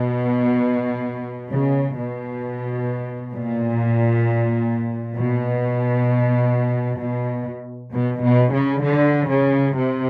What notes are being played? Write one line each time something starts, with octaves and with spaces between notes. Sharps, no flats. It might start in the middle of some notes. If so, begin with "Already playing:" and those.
Already playing: B2
C#3
B2
A#2
B2
B2
B2
B2
C#3
D3
C#3
C3